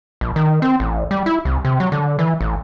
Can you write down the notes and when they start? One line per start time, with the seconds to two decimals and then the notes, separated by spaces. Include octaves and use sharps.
0.21 A#1
0.36 D#3
0.62 C4
0.80 A1
1.11 G3
1.26 E4
1.45 C2
1.65 C3
1.80 F#3
1.92 D3
2.19 E3
2.41 A1